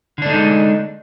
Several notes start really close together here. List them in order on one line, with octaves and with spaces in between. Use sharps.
D3 D4 A3 D#4 G#3